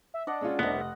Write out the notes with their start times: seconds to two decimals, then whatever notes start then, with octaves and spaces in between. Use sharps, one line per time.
0.14 E5
0.27 D4 D5 D#5 F#5
0.41 G#3 C#4 F4 E6
0.59 F1 C2 B3 D#5 F#5